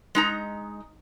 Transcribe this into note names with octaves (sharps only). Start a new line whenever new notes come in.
G#3 D#4 A#5